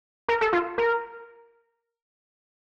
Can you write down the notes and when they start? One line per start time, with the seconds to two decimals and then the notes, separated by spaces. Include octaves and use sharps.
0.28 A#4
0.41 A4
0.53 F4
0.78 A#4